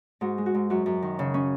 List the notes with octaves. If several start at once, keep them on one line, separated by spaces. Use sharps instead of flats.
G#2 F#4
G#3
F#4
G#2
F#2 F#4
F#2
D#3
C#3
C#4